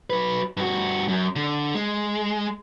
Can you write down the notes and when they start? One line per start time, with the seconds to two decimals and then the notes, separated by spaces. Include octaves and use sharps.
0.10 F#3 B4
0.57 G2 F#4
1.08 F#2
1.36 D3
1.75 G#3